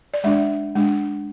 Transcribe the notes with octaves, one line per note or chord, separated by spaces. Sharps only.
D5
G#3 D4 E5
G#3 D4